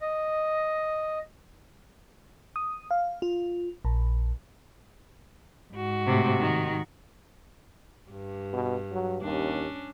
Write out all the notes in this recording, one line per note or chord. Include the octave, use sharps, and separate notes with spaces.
D#5
D#6
F5
F4
A#1
G#2 F#4
A2 C3
D#3
G2
B2
F#3
D#2 C#4 D4